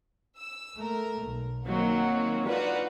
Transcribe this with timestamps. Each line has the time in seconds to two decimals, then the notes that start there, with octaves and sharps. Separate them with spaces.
0.37 E6
0.78 A3 A#4
1.24 B1
1.66 D#3 F#3 A#3 C4 F#4
2.47 D4 D#4 F4 F#4 B4 D5